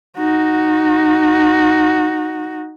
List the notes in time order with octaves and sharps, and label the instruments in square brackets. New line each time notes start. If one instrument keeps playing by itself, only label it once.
[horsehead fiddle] D#4 F#4